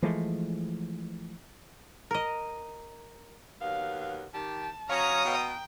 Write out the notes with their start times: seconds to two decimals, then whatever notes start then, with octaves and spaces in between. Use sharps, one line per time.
0.02 E3 F3 G#3 A3
2.11 A#4 D#5
3.60 D#2 F#3 B3 F5
4.34 D#3 G4 A5
4.89 F#3 C#4 C#5 F5 A#5 D#6
5.25 B2 G5